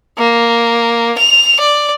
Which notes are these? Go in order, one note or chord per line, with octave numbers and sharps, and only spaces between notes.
A#3
F7
D5